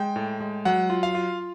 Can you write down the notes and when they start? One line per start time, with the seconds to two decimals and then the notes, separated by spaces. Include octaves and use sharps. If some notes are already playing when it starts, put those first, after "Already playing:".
Already playing: G#3 G5
0.16 A2
0.41 G#3
0.65 F#3 F#5
0.90 F4
1.03 F5
1.15 F4